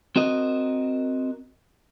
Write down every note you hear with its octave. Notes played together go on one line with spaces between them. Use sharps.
C4 F#4 A#4 D#5